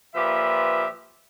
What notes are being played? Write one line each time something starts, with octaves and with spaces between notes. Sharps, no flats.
A#2 F3 G4 B4 E5